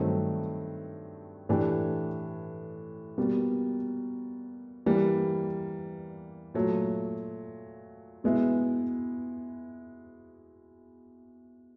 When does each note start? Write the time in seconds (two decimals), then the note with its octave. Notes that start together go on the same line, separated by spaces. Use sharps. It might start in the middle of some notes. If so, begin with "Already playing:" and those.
Already playing: G2 D#3 F#3 A3 C4
1.49 A2 E3 A3 D4 G4
3.18 B2 G3 A#3
4.86 E3 G3 A#3
6.54 A#2 F#3 A3
8.24 B2 G#3 B3 E4